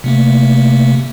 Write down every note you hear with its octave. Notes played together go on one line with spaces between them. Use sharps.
C3 A3 A#3